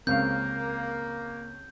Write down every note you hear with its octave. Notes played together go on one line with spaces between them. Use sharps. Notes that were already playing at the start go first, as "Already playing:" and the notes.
C#2 C#3 A#3 C4 F5 G6